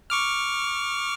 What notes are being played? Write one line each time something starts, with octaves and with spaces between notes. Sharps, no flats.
C#6 D6 F6